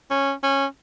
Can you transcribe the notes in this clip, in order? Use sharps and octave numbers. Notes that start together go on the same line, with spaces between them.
C#4
C#4